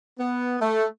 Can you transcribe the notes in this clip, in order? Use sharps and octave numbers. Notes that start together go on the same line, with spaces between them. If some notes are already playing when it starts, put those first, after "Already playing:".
B3
A3